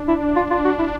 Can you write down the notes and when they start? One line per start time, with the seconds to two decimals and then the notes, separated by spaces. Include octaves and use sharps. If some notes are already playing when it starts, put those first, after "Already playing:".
Already playing: D4
0.08 E4
0.36 F4
0.51 F4
0.65 F#4
0.79 E4